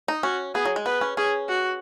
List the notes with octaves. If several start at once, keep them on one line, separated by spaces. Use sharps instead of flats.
D#4
C#4 F#4
B3 G#4
F#3
G#3
B3 B4
C#4
C#4 G#4
F#4